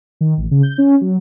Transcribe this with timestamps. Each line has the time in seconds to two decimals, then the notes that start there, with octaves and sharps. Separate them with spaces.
0.21 D#3
0.37 A1
0.51 C#3
0.63 G6
0.78 C#4
1.01 F#3